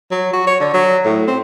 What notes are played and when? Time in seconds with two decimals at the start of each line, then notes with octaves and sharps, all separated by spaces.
0.11 F#3
0.33 F#4
0.47 C#5
0.60 D3
0.74 F#3
1.05 A2
1.27 C4